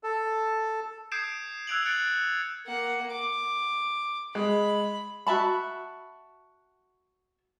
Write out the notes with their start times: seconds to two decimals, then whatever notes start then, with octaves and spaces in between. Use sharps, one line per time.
0.03 A4
1.12 D#6 G6 G#6 C7 D7 E7
1.67 E6 F#6 G#6 D7 F7 F#7
1.86 F#6 A6 C#7 D7
2.66 A#3 F#5
3.10 D6
4.35 G#3 B5
5.27 F#4 E5 A5 B5